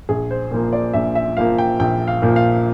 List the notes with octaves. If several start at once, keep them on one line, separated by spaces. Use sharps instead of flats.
A#1 G#4
C5
A#2 F3 A#3
D5
A#1 E5
E5
A#2 F3 A#3 F5
G5
A#1 G5
F5
A#2 F3 A#3
F5